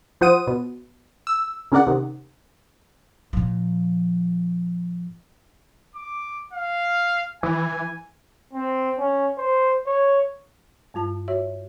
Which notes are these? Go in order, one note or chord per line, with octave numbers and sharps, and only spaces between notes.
F3 F4 C5 F#5 D#6 D#7
B2
E6
C#3 C#4 A#4 D5 F#5
C3 D#3
A#2 F3
D6
F5
E3 G#5
C4
C#4
C5
C#5
G2 G3 F4 A5
F#4 C#5 E5